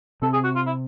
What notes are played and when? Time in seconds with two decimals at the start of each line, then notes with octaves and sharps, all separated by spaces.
0.22 C3 C4 A4
0.33 G#4
0.44 F#4
0.56 F4
0.67 E4